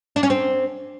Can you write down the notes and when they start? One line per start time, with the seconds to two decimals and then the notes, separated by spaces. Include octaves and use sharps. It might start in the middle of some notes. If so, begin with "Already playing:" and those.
0.16 D4
0.23 C#4
0.30 C4